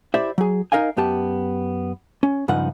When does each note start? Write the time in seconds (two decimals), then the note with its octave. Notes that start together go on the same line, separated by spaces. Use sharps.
0.14 E4 G4 C5 D5 E5
0.38 F#3 G#4
0.72 D#4 A#4 D#5 F5 G#5
0.97 F#2 B3 G4 A5
2.23 C#4
2.48 C#2 G2 C#3 F3 D#4 F#5